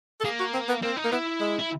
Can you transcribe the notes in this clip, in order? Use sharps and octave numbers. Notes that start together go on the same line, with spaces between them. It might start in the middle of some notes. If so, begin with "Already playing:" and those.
A4
A#3 G#4
F#4
C4
B3
A#3 C4
D#4
A#3
B3 E4
G#3
E4